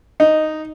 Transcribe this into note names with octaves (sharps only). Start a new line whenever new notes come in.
D#4